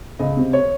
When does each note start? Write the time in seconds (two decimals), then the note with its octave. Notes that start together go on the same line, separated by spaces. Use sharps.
0.19 C#2 D#5
0.37 C3
0.53 C#5